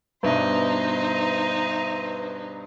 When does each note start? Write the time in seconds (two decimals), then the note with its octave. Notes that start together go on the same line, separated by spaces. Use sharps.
0.23 G2 B2 D4 D#4 B4 C5 E5